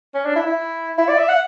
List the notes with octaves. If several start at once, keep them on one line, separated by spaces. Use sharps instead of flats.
C#4
D4
E4
E4
E4
D5
E5
F#5